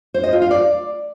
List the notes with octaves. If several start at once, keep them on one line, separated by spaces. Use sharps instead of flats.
C5
D#5
F4
F5
D5